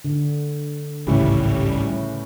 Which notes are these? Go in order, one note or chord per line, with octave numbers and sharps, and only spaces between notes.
D3
G#1 C#2 A2 C#3 E3 G3